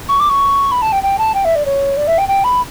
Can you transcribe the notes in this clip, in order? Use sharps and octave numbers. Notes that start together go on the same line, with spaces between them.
C#6
D6
C#6
B5
A5
G5
G5
A5
G5
E5
D5
C#5
D5
E5
G5
G5
B5